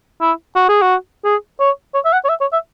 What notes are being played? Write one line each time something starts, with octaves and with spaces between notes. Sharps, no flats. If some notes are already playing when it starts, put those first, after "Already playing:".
E4
F#4
G#4
F#4
G#4
C#5
C#5
E5
F#5
C#5
E5
C#5
E5